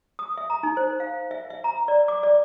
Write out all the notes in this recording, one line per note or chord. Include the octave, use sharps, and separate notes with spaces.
D#6
E5
A#5
D#4
C5
F5
E5
E5
A#5
D5
D6
D5